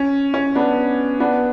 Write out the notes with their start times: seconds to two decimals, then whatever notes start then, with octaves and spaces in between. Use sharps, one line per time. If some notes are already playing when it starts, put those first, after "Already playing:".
Already playing: C#4
0.34 C#4
0.55 B3 D4
1.20 B3 D4